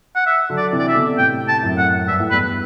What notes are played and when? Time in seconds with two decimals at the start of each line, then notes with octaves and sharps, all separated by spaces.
0.15 F#5
0.27 E5
0.49 D3 F#3
0.57 D5
0.72 C3 E3
0.79 D5
0.88 E5
0.95 B2 D3
1.17 A2 C3 G5
1.48 A5
1.63 F#2 A2
1.78 F#5
2.08 G2 E5
2.20 A2
2.31 E2 G2 B4